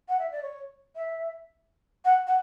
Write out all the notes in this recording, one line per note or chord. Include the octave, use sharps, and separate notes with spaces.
F#5
E5
D5
C#5
E5
F#5
F#5